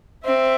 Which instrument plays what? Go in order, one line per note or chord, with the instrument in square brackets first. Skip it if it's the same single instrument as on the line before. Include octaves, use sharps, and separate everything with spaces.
[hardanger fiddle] C4 [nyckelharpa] E5